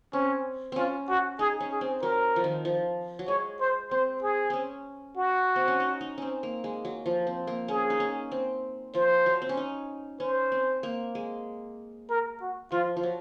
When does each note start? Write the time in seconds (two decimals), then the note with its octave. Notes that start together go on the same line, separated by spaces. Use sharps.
0.13 C4 C#4
0.72 C4 C#4 F4
1.09 F#4
1.39 D#4 G#4
1.60 C#4
1.71 G#4
1.81 C4
2.02 F#3 A#4
2.36 F3
2.44 D#3
2.65 F3
3.19 F#3
3.28 G#3 C#5
3.60 C5
3.91 C4 C5
4.22 G#4
4.50 C4 C#4
5.17 F#4
5.56 C4
5.68 C#4
5.80 D#4
6.01 D#4
6.18 C4 C#4
6.43 A#3
6.64 G#3
6.85 F#3
7.06 F3
7.27 C4
7.47 A#3
7.68 C#4 G#4
7.90 D#4
8.00 C#4
8.32 C4
8.95 F3 C5
9.26 F#3
9.42 C4
9.49 C#4
9.57 D#4
10.20 C#4 C5
10.52 C4
10.83 A#3
11.15 G#3
12.09 A#4
12.41 F#4
12.72 F3 F4
12.96 F3
13.03 F#3